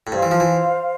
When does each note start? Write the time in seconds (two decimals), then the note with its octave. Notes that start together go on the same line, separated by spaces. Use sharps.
0.07 A2
0.12 G2 C5 F5 C6
0.23 E3
0.31 F3
0.40 E3